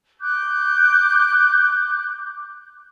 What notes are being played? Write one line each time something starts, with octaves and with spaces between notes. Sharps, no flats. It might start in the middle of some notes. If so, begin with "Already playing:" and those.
D6 F#6 G6